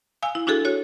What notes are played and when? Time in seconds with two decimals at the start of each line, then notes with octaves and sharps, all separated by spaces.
0.23 F5 G#5 E6
0.35 E4
0.47 D4 E4 F#4 G#4 A4
0.65 F#4 C#5